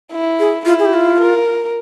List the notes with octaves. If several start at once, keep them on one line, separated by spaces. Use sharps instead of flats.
E4
G#4
E4 F4
G#4
G4
F4
A#4